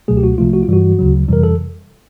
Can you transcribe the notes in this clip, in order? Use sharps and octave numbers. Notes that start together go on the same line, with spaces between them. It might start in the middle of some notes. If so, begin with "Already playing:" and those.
C#2 B2 F#3 A3 G#4
G4
F#4
C2 C3 F3 A3 F4
F#4
F4
G2 E3 G3 F#4
D2 C#3 F#3
F2 C3 E3 G3 A#4
A4